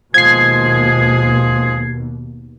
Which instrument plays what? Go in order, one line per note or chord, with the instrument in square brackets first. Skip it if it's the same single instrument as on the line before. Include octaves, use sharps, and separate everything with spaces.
[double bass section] D#2 B2 [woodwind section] F3 G#3 G#4 [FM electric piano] G#6 C7